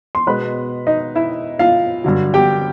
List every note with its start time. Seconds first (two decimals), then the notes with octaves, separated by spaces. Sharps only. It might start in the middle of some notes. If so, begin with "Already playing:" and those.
0.15 C6
0.27 B2 G#3 B3 B4 B5
0.87 D#4 D#5
1.15 E4 E5
1.59 F4 F5
2.04 G2 D3 F#3
2.34 G4 G5